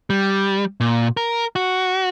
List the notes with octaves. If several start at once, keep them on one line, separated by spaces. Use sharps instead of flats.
G3
A#2
A#4
F#4